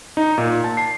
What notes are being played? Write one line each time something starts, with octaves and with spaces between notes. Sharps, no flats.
D#4
A#2
A5
C7